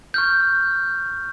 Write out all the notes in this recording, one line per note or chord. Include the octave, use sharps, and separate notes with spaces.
C#6 F6 G6